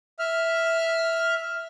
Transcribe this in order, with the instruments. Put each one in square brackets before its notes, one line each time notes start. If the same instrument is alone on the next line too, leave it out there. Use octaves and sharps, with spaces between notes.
[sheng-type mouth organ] E5 F6